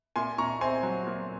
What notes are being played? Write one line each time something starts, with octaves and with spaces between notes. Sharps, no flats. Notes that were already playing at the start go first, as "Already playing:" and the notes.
A#2 G#5 C6
A#2 A#5 C#6
C4 G#5 C6
F#3
A#2